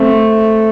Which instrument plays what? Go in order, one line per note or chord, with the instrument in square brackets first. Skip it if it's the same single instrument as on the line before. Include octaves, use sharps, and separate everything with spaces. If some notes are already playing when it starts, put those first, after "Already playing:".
Already playing: [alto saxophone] A3 [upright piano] C4